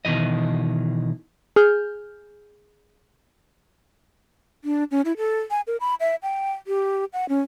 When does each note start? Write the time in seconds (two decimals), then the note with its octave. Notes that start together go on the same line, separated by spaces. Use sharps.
0.05 B2 D#3 E3 D#5
1.56 G#4 F6 G6
4.63 D4
4.91 C#4
5.05 E4
5.17 A4
5.51 G#5
5.67 A#4
5.80 B5
6.00 E5
6.23 G5
6.67 G4
7.13 F#5
7.29 C#4